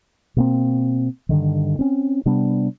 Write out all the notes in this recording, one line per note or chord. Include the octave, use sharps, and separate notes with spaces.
B2 A#3 C4
G2 D3 D#3
C4 C#4
C3 G3 B3 D4